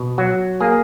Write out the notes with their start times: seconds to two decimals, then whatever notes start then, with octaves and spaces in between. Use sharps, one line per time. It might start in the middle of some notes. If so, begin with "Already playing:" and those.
Already playing: B2
0.18 F#3 F#4
0.61 A#3 G#4